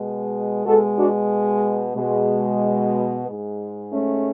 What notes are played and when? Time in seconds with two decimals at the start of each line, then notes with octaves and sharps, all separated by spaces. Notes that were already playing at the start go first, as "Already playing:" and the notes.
Already playing: B2 G#3
0.66 B2 G#3 F#4 A4
0.97 D4 F#4
1.96 B2 G#3
3.27 G#2 G#3
3.92 A3 C#4